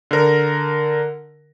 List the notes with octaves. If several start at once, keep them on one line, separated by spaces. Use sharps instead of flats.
D3 A#4